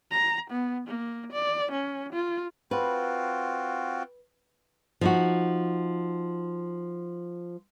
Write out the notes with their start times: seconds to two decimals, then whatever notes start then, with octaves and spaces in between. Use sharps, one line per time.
0.11 A#5
0.50 B3
0.87 A#3
1.32 D5
1.71 C#4
2.13 F4
2.71 C4 F4 F#4 B4
5.01 F3 D#4 F#4